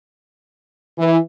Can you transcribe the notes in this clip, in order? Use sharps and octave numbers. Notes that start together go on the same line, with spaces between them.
E3